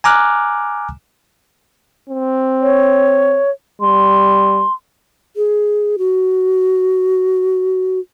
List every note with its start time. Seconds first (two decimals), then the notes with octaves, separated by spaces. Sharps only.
0.04 G#5 A#5 D6 F6 F#6
2.09 C4
2.62 C#5
3.81 G3 C6
5.36 G#4
5.98 F#4